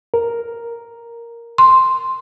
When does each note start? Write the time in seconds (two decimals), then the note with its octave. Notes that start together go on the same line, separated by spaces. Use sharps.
0.14 A#4
1.58 C6